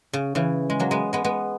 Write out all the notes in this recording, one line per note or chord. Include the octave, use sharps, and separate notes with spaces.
C#3
C#3 E3
G#3
F#3 A#3
G#3 B3
G#3 B3
G#3 B3